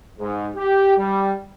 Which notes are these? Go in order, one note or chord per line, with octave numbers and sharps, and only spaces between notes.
G#2
G4
G3